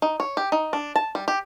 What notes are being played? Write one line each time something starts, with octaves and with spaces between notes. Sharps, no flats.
D#4
C#5
G4
D#4
D4
A5
G3
G4